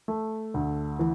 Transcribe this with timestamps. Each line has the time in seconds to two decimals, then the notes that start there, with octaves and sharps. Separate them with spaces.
0.08 A3
0.54 D2
0.99 E3